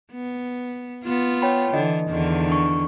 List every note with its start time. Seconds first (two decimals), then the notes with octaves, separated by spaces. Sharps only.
0.12 B3
1.04 B3 F4
1.42 C#5 G5 B5
1.74 D3 E3 D#5
2.08 E2 D3 D#3
2.49 D4 C#6